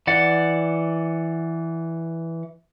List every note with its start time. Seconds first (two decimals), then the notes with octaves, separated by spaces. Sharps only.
0.07 E3 D5 F#5